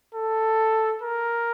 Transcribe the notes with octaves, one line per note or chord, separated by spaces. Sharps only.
A4
A#4